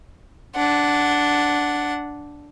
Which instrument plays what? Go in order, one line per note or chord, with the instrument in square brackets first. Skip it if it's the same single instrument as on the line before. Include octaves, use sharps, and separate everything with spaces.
[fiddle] D4 F#5